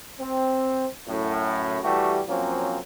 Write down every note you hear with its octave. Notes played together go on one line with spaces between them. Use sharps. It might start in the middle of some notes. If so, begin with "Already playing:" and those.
C4
F#2 A2
E3 G3 A3 F#4 G4
F3 F#3 A#3 C4 C#4